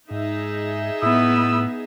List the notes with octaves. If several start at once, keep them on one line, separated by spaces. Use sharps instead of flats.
G#2 D#4 G#4 E5
A2 B3 E4 D#6 E6